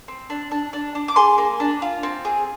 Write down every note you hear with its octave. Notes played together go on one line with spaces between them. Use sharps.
C4
D4
D4
D4
D4
D6
G#4 G#5 C6
A#3
D4
F4
C4
G#4